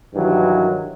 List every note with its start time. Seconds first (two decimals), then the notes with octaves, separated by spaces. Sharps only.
0.14 G2 D#3 E3 F#3